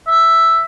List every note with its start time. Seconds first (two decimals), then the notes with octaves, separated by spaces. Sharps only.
0.07 E5